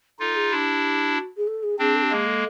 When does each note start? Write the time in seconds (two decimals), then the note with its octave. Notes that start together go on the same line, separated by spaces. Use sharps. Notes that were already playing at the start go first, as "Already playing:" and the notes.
0.19 D#4 F4 A4
0.36 G#4
0.51 D4 E4 G4
1.15 F#4
1.37 G#4
1.47 A4
1.63 G#4
1.79 C4 D4 G#4
1.95 A4
2.02 G4
2.11 G#3 A#3 G#4
2.26 A4